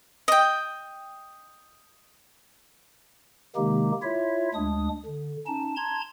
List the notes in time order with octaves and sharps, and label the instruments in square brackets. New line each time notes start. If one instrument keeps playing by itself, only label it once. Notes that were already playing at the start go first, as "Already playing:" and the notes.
[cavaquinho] D#5 G5
[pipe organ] C3 D#3 G#3 A#3 D#4 G4
E4 F4 C#5 E5
D2 G#3 D4 D#6
D3
C#4 D#4 A5
A5 A#5 C6 G#6